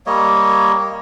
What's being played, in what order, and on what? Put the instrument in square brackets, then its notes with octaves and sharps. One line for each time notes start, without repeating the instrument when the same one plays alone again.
[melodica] G3 A#3 C#5 D#5